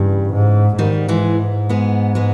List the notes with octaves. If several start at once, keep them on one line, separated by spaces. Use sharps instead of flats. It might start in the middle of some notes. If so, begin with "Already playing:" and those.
Already playing: G2 C#3 E3
G#2
G#2 D#3 G3
E3 G#3
G#3 B3
G#3 B3